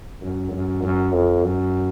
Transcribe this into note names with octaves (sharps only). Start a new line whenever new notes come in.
F#2
F#2
F#2
F2
F#2